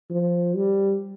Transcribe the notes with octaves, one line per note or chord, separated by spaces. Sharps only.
F3
G3